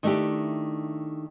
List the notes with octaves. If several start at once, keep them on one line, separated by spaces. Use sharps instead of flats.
D#3 A3 D4 E4 G4